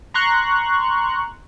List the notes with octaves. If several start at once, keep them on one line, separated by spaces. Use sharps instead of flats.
A#5 C6 C#6 F#6